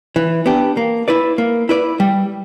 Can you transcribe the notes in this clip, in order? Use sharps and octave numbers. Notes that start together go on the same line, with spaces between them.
E3
B3 D4 G4
A#3
E4 B4 D5
A#3
E4 B4 D5
G3